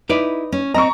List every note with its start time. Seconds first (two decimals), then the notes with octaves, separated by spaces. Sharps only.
0.09 D#4 E4 B4 D5
0.52 C#4
0.74 C4 D#5 A#5 C#6